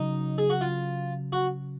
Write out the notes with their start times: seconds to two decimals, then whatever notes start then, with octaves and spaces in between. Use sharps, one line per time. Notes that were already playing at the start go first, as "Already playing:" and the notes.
Already playing: C#3 F#3 D#4
0.38 G#4
0.50 F#4
0.61 F4
1.32 F#4